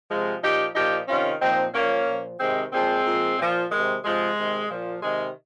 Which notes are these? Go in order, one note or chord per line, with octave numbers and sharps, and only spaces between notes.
C3 F3 G#3
A#2 F3 D#4 G4
A#2 F3 D#4 G4
C3 D#3 C#4 F4
A#2 F3 C4 D#4
A#2 F3 A#3 C#4
A#2 F3
C3 D#3 G#3 C4
A#2 F3 G#3 C4
A#2 F3
A#2 F3
C3 D#3 G#3
C3 F3 G#3
C3 D#3
A#2 F3
C3 D#3 G#3